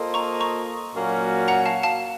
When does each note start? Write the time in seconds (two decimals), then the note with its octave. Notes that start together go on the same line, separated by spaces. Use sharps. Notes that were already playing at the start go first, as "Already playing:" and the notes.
Already playing: A#3 F4 A4 C5 D#5
0.14 A#5 C#6
0.40 A#5 C#6
0.94 A#2 F#3 A#3 C#4 F#4
1.48 F#5 A#5
1.65 F5 A5
1.83 F5 A5